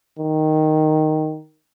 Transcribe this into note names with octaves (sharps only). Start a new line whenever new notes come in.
D#3